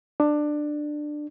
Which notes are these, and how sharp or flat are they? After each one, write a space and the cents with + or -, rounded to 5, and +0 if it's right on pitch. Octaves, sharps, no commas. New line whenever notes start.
D4 +15